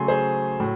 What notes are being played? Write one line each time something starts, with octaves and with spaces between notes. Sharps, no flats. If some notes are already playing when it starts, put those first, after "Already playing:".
Already playing: C#3 F#3 A3 G#5 C6
G#4 C5
A2 F#3